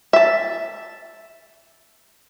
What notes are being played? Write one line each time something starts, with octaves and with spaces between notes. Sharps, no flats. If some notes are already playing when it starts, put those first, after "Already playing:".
E5 A5